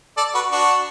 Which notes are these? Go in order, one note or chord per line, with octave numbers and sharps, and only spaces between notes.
A4 D5
F#4 B4
D4 F#4